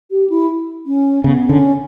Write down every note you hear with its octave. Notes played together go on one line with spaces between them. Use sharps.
G4
E4
C#4
C#3 B3
D3 C#4